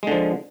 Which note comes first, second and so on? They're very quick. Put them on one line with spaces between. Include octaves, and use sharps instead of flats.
G#3 D3 F3